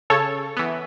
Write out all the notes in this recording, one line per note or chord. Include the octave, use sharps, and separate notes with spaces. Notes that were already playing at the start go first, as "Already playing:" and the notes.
C#3 A4 C#5
E3 B3